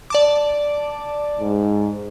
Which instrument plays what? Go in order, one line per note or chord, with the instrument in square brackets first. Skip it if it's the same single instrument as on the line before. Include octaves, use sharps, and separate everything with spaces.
[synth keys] D5 A5 D6
[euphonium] G#2